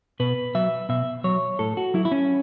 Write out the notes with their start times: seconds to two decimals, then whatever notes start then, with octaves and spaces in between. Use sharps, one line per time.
0.20 B2 B4
0.55 F#3 E5
0.89 B2 E5
1.24 F#3 C#5
1.59 A2 A4
1.77 F#4
1.94 F#3 E4
2.05 E4
2.12 C#4